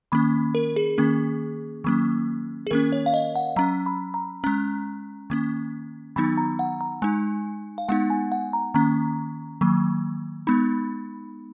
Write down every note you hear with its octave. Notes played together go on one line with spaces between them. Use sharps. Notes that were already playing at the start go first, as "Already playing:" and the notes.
D#3 A#3 C#4 B5
A#4
G#4
D#3 A#3 C#4
D#3 F#3 A#3 C#4
G#4
D#3 A#3 C#4 A#4
C#5
F5
D#5
F#5
F#3 C#4 A#5
B5
A#5
G#3 C#4 A#5
D#3 A#3 C#4
D#3 F#3 B3 D#4 B5
A#5
F#5
A#5
G#3 D#4 G#5
F5
G#3 B3 D#4 F#5
G#5
F#5
A#5
D#3 A#3 C#4 A#5
D#3 F#3 A#3
G#3 B3 D#4 B5